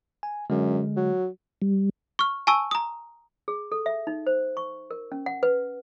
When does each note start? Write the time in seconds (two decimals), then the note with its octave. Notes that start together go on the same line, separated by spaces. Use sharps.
0.23 G#5
0.50 F#2 D3 G#3
0.96 F#3
1.62 G3
2.19 C#6 F6
2.47 G#5 A5 C#6 E6
2.71 A#5 D#6
3.48 G#4
3.72 A4
3.86 E5
4.07 D#4
4.27 C5
4.57 C#6
4.91 A#4
5.12 C#4
5.26 F#5
5.43 B4